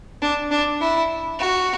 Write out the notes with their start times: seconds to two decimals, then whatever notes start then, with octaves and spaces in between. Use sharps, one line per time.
0.22 D4
0.51 D4
0.81 E4
1.39 F#4